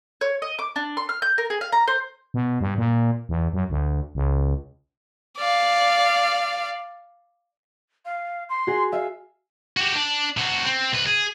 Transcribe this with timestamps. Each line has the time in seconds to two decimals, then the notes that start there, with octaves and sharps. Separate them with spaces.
0.21 C#5
0.42 D#5
0.59 D6
0.76 D4
0.97 C6
1.09 F6
1.22 G6
1.38 A#4
1.50 G#4
1.61 F5
1.72 A#5
1.88 C5
2.34 B2
2.61 G2
2.78 A#2
3.29 E2
3.53 F#2
3.70 D2
4.15 C#2
5.38 D5 F5
8.05 F5
8.49 C6
8.67 F#4 G#4
8.92 E5 F5
9.77 F#4 G4
9.95 D4
10.37 C3 F#4
10.66 C4
10.93 C2 B4
11.06 G#4